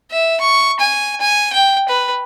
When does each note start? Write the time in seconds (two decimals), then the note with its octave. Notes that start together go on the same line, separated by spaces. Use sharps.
0.11 E5
0.41 C#6
0.80 G#5
1.21 G#5
1.53 G5
1.89 B4